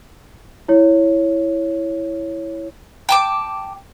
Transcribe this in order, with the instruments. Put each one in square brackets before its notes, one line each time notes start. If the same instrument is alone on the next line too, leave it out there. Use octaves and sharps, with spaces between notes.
[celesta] E4 C#5
[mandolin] G5 A5 D6